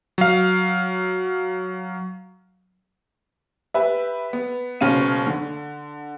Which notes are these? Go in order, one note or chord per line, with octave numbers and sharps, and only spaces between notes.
F#3 F5
G4 B4 E5
B3
F#1 B2 C#4 F5 D#7
D3